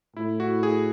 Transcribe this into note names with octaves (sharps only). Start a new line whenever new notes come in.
A2 E4
F#4
G#4